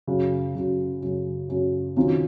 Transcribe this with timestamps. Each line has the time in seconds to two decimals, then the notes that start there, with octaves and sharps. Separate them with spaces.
0.07 F#2 C#3 F#3 C#4 F#4
0.55 F#2 C#3 F#3 C#4 F#4
1.02 F#2 C#3 F#3 C#4 F#4
1.49 F#2 C#3 F#3 C#4 F#4
1.97 C3 D#3 F#3 C#4 F4